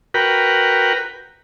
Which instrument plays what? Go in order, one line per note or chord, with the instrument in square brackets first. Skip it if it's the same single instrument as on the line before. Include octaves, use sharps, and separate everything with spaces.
[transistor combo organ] F#4 A#4 B4 G5